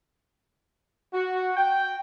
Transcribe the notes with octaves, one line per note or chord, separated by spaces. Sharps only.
F#4
G5